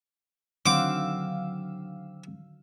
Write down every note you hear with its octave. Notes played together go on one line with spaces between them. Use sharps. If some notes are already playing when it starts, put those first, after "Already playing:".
D3 D#3 F#3 C4 F5 F#5 D6 E6